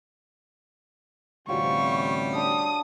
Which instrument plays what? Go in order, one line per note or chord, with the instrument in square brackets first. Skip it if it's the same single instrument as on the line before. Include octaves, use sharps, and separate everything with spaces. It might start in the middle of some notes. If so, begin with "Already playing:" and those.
[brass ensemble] A1 D2 C3 [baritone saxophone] G3 [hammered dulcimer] F4 F#4 C#5 [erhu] C#6
[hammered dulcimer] D4 [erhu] D#6